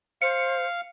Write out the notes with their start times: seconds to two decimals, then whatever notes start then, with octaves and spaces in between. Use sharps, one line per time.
0.22 C5 F5 C#7